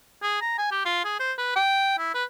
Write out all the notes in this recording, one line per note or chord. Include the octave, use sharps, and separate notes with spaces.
G#4
A#5
G#5
G4
F4
G#4
C5
B4
G5
E4
B4